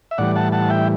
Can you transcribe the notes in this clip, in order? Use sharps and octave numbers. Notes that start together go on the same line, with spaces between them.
E5
A2 E3 G3 D5 F#5
F#5 A5
F#5 A5
E5 G5